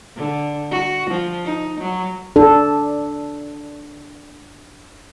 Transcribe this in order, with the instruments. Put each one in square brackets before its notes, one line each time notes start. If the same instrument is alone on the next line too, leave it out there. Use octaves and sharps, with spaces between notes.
[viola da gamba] D3
F#4
F3
D#4
F#3
[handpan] D4 A4